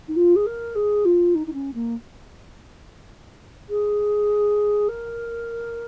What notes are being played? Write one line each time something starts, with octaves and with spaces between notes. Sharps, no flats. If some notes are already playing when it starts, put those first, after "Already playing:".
D#4
F4
G#4
A#4
G#4
F4
D#4
D#4
C#4
A#3
G#4
A#4